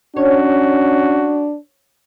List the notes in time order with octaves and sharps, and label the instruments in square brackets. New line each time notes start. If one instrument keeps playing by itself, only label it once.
[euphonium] C#4 [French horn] D4 [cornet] F#4 [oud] C#5